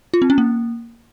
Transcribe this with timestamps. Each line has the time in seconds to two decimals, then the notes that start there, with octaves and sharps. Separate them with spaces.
0.14 F4
0.22 C4
0.30 C#4
0.38 A#3